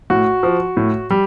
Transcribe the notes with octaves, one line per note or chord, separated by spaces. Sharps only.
A2 F#4
F3
A2
G3